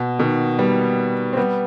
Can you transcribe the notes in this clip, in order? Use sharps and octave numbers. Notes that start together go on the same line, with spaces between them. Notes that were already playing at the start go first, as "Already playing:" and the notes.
Already playing: B2
B2 D#3
G3 B3
C4
G3 B3